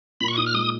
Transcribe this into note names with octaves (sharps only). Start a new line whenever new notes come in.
A#2 B5
C#6
D#4 D#6
F6
G#3 D#6